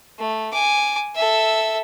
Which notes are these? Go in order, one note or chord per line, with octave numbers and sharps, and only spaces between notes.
A3
G#5 D6
A4 E5